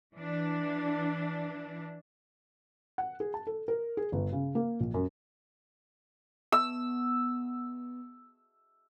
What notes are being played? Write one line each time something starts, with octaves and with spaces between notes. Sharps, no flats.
E3 D4
F#5
G#4
A5
A4
A#4
G#4
G1
C#3
A#3
A#1
F#2
B3 E6